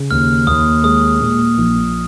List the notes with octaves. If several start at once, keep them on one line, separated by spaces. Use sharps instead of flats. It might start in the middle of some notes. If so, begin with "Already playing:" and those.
Already playing: C#3
D#2 F6
D#2 D#6
G#3 D#6
A#2
A#1